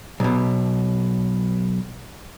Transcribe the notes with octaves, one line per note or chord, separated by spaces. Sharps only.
B1 B2